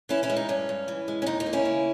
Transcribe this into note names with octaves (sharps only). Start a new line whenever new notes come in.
E3 C#4 E4
C#4 E4
G#3
D#4
G2 C#4
G2
E3
G#3
C#4
D#2 D#4
D#4
A#3
C#4 E4
C#3